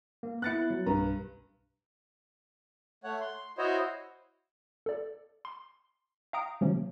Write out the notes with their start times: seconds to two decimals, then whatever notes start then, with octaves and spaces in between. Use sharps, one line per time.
0.23 A#3
0.42 B3 E4 F#6 A6 C#7
0.70 F#3
0.86 B1 G2 B4 A#5
3.04 A3 C#5 F#5
3.21 C6
3.58 E4 F#4 C5 C#5 D#5
4.86 A4 D5
5.45 C6
6.33 F5 G5 A#5 D#6 D7
6.61 C3 D#3 F3 F#3 A#3 C#4